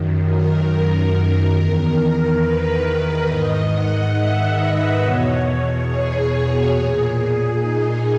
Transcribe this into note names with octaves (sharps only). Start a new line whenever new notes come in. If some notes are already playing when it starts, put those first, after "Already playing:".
Already playing: F#2 D#3
A#4
E2 D#3
B4
G#2 D#3 D#5
F#5
E5
B4
E2 B2 C#5
G#4
A#2
D#4